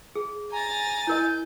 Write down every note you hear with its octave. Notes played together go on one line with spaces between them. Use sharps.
G#4
G#5 A#5 A6
E4 A#4 D#5 G6